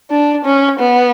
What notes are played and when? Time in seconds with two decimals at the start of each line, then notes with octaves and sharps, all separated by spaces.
0.11 D4
0.45 C#4
0.79 B3